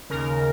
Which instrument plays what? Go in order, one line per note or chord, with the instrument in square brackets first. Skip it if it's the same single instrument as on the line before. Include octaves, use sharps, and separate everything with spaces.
[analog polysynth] D#2 C#3 A#4